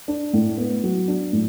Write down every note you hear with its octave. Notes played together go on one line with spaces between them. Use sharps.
D4
A2
B3
F#3
D4
A2